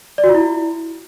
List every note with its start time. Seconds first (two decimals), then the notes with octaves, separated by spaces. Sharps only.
0.18 D5
0.24 F#4
0.29 F4
0.35 E4